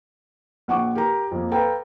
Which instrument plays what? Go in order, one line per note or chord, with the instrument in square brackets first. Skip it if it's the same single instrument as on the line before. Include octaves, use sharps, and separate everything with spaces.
[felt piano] A#1 F#5 C#6 D6
G4 A#4 A#5
F2 A#3
A4 B4 F5 G5 A#5